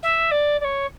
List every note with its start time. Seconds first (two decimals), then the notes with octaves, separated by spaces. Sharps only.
0.03 E5
0.31 D5
0.60 D5
0.64 C#5